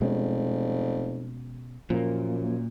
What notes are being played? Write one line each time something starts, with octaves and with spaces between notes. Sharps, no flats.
F1 B2 G#3 C#4
F#2 A#2 F3 A#3